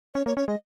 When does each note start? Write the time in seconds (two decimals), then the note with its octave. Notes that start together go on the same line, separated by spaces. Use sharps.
0.15 C#4 C#5
0.26 A#3 C#5
0.37 C#4 C#5
0.48 G#3 D#5